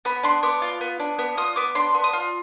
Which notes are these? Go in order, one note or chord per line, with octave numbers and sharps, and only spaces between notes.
B3 B5
D4 C6
B3 D6
F4
B3
D4
B3
F4 D#6
B3 D6
D4 C6
B3
D#6
F4